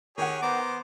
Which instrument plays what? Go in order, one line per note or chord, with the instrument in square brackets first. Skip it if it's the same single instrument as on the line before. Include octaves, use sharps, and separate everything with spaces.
[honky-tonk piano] D#3 F#5 [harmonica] G4 G#4 C#5
[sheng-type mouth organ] B3 [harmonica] C5 A#5 [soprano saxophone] D6